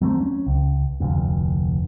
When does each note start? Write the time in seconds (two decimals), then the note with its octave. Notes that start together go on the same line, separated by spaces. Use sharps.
0.01 F#3 A3 C4
0.20 C#4
0.47 C#2
1.00 F1 D2